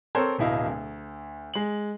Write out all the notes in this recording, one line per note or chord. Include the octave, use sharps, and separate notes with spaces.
C4 A4 A#4 C5 C#5
D1 B2 E4 D#5 F5
D2
G#3 F#7